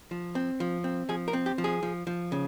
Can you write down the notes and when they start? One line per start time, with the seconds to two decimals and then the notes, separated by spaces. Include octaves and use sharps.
0.11 F3
0.35 C4
0.60 F3
0.84 C4
1.09 F3 G#4
1.28 A#4
1.33 C4
1.46 G4
1.58 F3
1.64 G#4
1.83 F3
2.07 F3
2.32 C#3